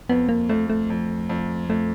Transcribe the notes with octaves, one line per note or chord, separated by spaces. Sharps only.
F2 B3
A#3
F2 A3
A3
F2
F2
F2 A3